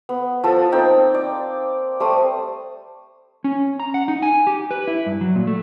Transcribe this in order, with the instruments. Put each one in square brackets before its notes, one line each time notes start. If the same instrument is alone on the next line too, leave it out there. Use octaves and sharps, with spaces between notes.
[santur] B3
F3 A4 D#6
A#3 C4 D#4 G5
D5
G3 A3 C5 D#6
[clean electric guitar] C#4
A#5
F#5
D#4
G#5
G4
B4
E4
G2
F#3
A#2
A3